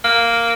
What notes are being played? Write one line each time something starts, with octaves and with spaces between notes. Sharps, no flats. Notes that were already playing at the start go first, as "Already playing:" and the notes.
A#3